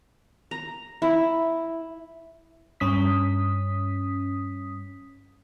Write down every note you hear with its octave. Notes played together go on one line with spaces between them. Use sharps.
A#5
E4
G2 C#4 D#6 B6